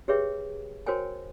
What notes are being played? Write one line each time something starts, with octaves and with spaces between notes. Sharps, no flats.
G4 G#4 B4 C#5 E5 G5
F#4 A#4 C5 C#5 G5 G#5